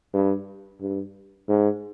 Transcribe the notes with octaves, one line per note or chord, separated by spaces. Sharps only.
G2
G2
G#2